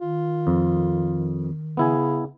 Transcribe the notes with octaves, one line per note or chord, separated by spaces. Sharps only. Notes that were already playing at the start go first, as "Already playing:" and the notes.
D#3 F4
F2
C#3 B3 E4 G#5